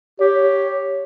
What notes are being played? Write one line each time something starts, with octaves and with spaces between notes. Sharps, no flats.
G4 C#5